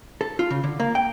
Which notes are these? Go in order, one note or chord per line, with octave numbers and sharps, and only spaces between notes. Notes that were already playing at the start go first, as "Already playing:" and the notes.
A4
F4
C#3
D3
A#3
G5